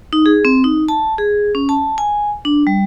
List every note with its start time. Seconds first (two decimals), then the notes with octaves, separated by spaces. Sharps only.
0.13 D#4
0.26 G#4
0.45 C4
0.64 D#4
0.88 A5
1.18 G#4
1.55 C#4
1.69 A5
1.98 G#5
2.45 D4
2.67 G3